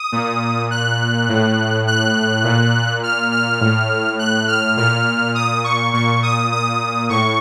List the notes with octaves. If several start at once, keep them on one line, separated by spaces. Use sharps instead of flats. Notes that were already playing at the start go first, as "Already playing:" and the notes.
Already playing: D#6
A#2
F#6
A2
F#6
A#2
F6
F6
A2
F#6
F6
A#2 F6
D#6
C#6
A#2 C#6
D#6
D#6
A2 C#6